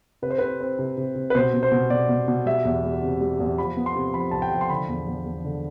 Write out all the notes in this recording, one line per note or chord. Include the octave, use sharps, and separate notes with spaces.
C3 B4
C5
C4 B4
C4
C3
C3
C3
B4
B2 C5
B2
C5
B2
B2 D5
B2
B2
G3 E5
E2
G3
C3
G3
E2
F3 B5
B3
C6
C3
F3 B5
C2 A5
G5
F3
C6
D3 B5
E2
E2
E2
D3